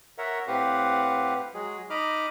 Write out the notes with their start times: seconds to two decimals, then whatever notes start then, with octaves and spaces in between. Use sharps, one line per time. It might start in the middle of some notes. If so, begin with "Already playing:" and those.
0.18 A#4 C#5 E5 F#5
0.48 A2 C4 G4 B4 F5 F#5
1.54 F#3 G#3 G#4
1.90 D#4 D#5 B5 D6 F6